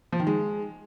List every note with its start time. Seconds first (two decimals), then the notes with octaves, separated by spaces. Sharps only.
0.12 F3
0.20 D#3
0.27 G#3